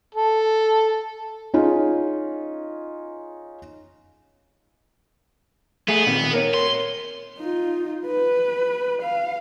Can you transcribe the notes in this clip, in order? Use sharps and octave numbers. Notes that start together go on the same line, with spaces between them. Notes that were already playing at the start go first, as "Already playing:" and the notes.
A4
C#4 D#4 F4 G#4
A3 B3 G#4
A#2 D#3 C4
A#4 C#5
C6
D#4 F4
B4
F5